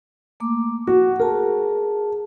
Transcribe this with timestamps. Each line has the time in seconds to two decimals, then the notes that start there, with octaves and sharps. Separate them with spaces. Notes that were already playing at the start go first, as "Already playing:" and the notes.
0.40 A3 A#3 D6
0.87 F#4 F#5
1.20 G#4 A#4 A5